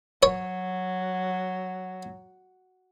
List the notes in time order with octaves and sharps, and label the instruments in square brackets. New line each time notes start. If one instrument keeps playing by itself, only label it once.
[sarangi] F#3 [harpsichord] C#5